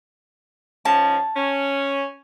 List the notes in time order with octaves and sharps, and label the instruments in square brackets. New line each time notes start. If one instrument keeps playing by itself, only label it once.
[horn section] G#2 F3 C#4 [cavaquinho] A5
[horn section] C#4